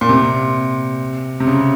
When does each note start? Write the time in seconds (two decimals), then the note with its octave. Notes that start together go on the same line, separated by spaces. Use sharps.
0.01 A#2
0.09 C3
1.40 C3
1.47 C#3